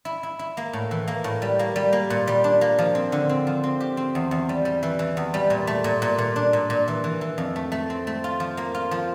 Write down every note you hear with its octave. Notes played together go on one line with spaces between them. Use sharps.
E4
E4
E4
A#3
A2
E3
A#3
A2
G3
A#3
G3
A#3
A#2
G3
D4
A#3
F3
C4
D3
C4
F3
C4
G4
C4
E2
E2
G3
G3
E3
E3
E2
G3
A#2
A3
A#2
A#2
A#2
D4
A#2
A#2
E3
E3
E3
F2
A3
A3
C4
A3
F4
F3
A#3
F4
F3